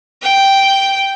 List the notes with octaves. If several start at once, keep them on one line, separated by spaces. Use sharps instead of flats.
G5